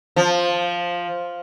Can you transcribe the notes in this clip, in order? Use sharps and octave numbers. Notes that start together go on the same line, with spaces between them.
F3